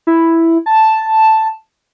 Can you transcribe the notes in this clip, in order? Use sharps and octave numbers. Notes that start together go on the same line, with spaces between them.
E4
A5